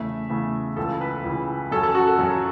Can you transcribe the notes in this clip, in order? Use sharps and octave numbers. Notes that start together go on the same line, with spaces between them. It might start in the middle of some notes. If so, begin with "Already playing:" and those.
Already playing: E2 C#3 A3 E5
E2 C#3 A3
C#2 C#3 E3 A4
B4
C#2 C#3 E3
F#2 F#3 C#4 A4
A4
F#4
A4
F#2 F#3 C#4